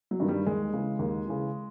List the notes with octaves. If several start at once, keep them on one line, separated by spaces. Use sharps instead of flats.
F#3
G2 D#3
G3
D#2 G#3
C#3 E3
D#2
C#3 E3